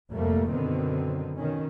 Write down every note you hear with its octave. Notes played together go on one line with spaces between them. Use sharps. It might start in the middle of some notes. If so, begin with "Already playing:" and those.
F1 F2 G#2 G3 A3 A#3
F#2 B2 D3 D#3 B3 C4
B2 D#3 C#4